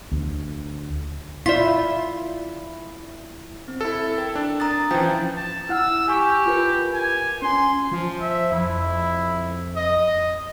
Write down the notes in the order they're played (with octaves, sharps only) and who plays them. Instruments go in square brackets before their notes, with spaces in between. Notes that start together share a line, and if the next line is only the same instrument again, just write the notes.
[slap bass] D2
[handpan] E4 [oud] F4 [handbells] D5 B6
[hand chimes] C4
[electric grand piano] E4 A4
[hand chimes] A#4 G5
[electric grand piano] D4
[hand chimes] A#5 D#6 A6
[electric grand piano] E3 F3 [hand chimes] C#4 G5 G6
[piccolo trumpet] A5
[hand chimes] E4 F#5 F6 [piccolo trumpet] E6
[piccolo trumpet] G4 [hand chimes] G#5 C#6
[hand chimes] F4 A#4 B4
[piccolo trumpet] G#5
[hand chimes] C#4 G#5 [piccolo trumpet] C6
[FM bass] F3
[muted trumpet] E5
[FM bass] F2 [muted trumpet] E4
[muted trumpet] D#5